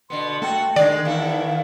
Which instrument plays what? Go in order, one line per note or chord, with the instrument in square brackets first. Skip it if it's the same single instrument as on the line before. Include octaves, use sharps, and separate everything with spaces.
[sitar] B2 D3 B3 [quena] C6
[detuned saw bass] A3 [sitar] F#4 A4 [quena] G5
[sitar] D3 G#3 [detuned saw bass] D#3 [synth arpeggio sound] D5
[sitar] E2 E4 A4 [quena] F5